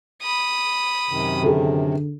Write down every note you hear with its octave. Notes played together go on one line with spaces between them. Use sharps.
B5 D#6
F#2 C3 D#3
D3 G#4 A4